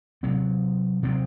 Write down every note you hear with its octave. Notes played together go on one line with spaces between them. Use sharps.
C3 F#3 C4
C3 F#3 C4